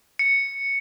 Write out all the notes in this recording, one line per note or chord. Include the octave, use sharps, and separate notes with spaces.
C#7